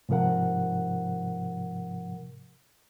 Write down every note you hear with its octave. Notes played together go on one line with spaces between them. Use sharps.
G#2 C3 F3 A#4 F#5